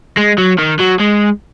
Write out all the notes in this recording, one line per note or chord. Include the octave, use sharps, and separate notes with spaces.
G#3
F#3
D#3
F#3
G#3